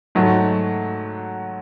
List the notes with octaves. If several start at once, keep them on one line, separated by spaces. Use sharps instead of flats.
G#2 F#3 A3